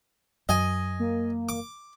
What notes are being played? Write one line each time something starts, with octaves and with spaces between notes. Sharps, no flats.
F#2 D#5 G#5
A#3
D6